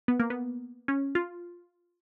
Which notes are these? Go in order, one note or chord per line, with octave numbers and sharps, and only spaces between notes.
B3
A#3
B3
C#4
F4